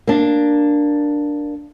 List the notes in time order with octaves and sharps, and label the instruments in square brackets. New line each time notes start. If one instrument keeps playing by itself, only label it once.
[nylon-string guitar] A#3 D4